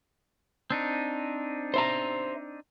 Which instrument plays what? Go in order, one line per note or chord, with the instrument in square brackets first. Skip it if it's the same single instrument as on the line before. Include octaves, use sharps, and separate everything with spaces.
[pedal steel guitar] C4 D4 D#4
[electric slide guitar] C5 E5 A#5